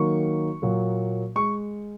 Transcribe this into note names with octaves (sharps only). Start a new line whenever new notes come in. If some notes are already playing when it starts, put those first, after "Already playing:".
Already playing: D#3 F#3 A#3 C#6
A#2 F#3 A#3
G#3 C#6